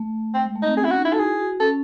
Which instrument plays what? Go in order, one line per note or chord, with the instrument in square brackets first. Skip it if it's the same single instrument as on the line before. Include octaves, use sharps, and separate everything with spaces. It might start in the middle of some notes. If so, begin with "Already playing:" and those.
Already playing: [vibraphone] A3
[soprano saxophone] C4
[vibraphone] G#3
A3
[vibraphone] C4 [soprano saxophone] D#4
[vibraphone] C#4 [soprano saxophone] G#4
[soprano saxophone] E4
F#4
[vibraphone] D#4
[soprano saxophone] E4
[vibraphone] F#4 [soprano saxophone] A4
[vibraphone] E4 [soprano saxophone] G#4
[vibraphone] F#4
[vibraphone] C#4 [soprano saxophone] A4